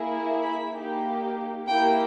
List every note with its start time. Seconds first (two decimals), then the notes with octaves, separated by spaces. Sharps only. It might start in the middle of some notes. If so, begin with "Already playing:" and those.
Already playing: A#3 E4 G#4
0.42 B5
0.74 A#3 D#4 G4
1.67 A#3 E4 G4 G5